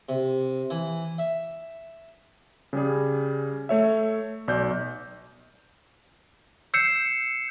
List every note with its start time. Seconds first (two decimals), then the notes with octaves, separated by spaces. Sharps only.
0.09 C3
0.70 E3
1.18 E5
2.73 C#3 G3 G#4
3.69 A3 C#5 E5
4.48 B1 D5 G6
6.74 E6 G6 C7 C#7 E7